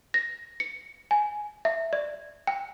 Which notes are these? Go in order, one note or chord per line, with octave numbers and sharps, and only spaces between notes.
A#6
C#7
G#5
E5
D5
G5